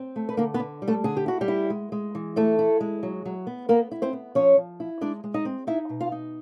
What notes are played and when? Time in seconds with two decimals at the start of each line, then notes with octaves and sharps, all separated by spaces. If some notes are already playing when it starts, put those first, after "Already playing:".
Already playing: C4
0.16 A3
0.29 B4
0.37 D3 A#3 A#4
0.54 B3 B4
0.60 D3
0.82 G3
0.88 A3 A4
1.04 D3 G#4
1.17 G4
1.26 E4 F#4
1.41 G3 G4
1.48 E4
1.70 G#3
1.92 G#3
2.15 E3
2.36 A3 E4 A4
2.59 E4
2.81 G#3
3.03 F#3
3.25 F#3
3.47 B3
3.69 A#3 B3 A#4
3.91 E4
4.02 C4 C5
4.13 B3
4.35 F3 C#4 C#5
4.57 F3
4.80 E4
5.01 G#3 D4 D5
5.24 G#3
5.34 D#4 D#5
5.45 C4
5.67 D#4 E4 E5
5.89 B2
6.00 F4 F5
6.12 D#4